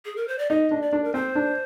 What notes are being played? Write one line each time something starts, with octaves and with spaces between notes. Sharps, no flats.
G#4
A#4
C5
D5
D#4 D#5
D4
D5
D4
A#4
C4 C5
D4